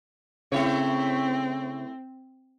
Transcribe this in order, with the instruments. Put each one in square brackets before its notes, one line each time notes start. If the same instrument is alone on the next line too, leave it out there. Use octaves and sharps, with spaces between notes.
[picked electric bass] C#3 [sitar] A3 E4 C#5 [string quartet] C4